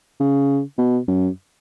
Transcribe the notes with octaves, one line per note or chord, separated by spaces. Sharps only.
C#3
B2
F#2